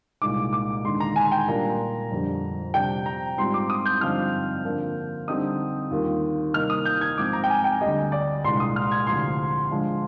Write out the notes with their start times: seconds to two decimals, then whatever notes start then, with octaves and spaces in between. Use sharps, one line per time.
0.22 C2 A#2 G#3 D#4 D6
0.53 D6
0.84 D#2 D3 G#3 D#4 C6
1.00 A#5
1.16 G#5
1.32 G5
1.48 A#2 G3 A#3 D4 F4 A#5
2.12 F2 D3 G3
2.74 C3 G3 D4 G5
3.06 A#5
3.38 G#2 G3 C4 F4 C6
3.54 D6
3.70 D#6
3.86 G6
4.01 G2 D3 F3 C4 D#4 F6
4.65 D3 F3 A#3
5.28 D3 G3 C4 D#4 D#6
5.91 D#2 D#3 G3 A#3 F4
6.54 C3 G3 A#3 D#4 F6
6.70 D#6
6.85 G6
7.01 G#6
7.18 G#2 F3 C4 D6
7.33 A#5
7.44 G5
7.50 G#5
7.64 G5
7.81 D2 D3 G3 D#5
8.12 D5
8.44 C2 A#2 G#3 D4 C6
8.60 D#6
8.76 F6
8.92 G#6
9.07 D2 C3 F3 C6
9.71 D3 F3 G#3